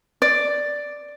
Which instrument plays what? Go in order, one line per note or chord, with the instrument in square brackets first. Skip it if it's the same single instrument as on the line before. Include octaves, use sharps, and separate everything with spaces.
[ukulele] D5